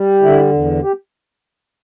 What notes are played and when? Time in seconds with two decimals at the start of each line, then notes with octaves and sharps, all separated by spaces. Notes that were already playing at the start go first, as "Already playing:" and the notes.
Already playing: G3
0.22 D3 E4
0.53 E2
0.83 G4